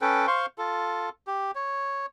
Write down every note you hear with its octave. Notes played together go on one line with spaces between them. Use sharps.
C#4 A4 B4 G5
C5 F5 C6 C#6
F4 A4
G4
C#5